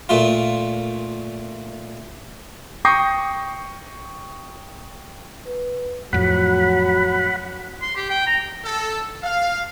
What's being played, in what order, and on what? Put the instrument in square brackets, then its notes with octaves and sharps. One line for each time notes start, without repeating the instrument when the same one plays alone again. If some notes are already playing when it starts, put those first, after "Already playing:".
[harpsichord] A#2 A3 F4
[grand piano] G5 C#6 D#6 G6 A#6 C7
[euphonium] B4
[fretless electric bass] F2 A2 [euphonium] F#3 [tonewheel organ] F#5 B5
[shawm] C6
G4
G5
A#5
[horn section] A4
F5